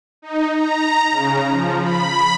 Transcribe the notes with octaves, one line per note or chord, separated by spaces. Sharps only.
D#4
A#5
C#3
F3
B5